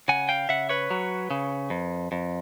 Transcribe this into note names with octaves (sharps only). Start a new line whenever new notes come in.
C#3 F#5 G#5
F5 G5
C#3 E5 F#5
B4 C#5
F#3
C#3
F2
F2